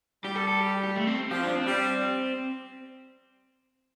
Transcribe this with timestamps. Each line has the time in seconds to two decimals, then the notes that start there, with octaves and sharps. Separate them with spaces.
0.24 G3 G4
0.36 A4
0.48 A4
0.60 G4
0.83 G4
0.96 A3
1.07 C4
1.31 F3 G4
1.43 D4
1.56 C4
1.67 G3